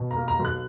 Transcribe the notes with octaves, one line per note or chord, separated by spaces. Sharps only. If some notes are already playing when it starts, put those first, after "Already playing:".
Already playing: B2
A#5
A#3
A#5
B1
F#6